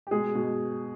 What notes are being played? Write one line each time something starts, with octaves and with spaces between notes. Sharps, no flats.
G4
B2 G#3 G#4
B2